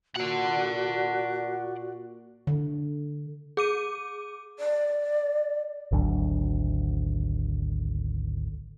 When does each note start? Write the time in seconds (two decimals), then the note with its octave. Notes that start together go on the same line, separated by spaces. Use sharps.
0.16 A#2 F#4 D5 F#5
2.47 D3
3.57 G#4 D6 D#7
4.57 D5
5.91 G#1 D2 F#3 D4